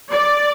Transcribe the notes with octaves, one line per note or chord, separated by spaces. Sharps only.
D5